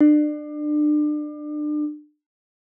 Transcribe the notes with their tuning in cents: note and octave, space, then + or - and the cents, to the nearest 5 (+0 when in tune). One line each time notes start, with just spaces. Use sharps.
D4 +30